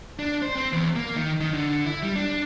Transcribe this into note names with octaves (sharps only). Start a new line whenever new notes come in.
D4
C5
C4
E2
A#3
D#3
D#3
D3
E4
G3
D4